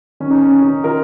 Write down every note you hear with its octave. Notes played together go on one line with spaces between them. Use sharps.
D#3 C#4
D#4
C#4
D#3
D#4
D#3 F4 A#4